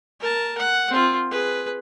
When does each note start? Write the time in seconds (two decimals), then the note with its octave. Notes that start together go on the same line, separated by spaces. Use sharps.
0.20 A#4 A5
0.58 F#5
0.90 C4 F4
1.31 G#4 B4